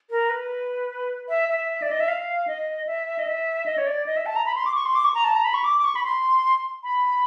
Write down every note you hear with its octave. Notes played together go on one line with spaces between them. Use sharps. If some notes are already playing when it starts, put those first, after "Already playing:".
A#4
B4
E5
E5
D5
D#5
E5
F5
D#5
E5
D#5
E5
D#5
C#5
D5
D#5
E5
A5
A#5
B5
C6
D6
C#6
C6
D6
C#6
A#5
A5
A#5
B5
C#6
D6
D6
C#6
B5
C6
B5